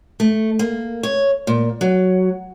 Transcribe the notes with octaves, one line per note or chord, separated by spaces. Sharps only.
A3
A#3
C#5
A#2
F#3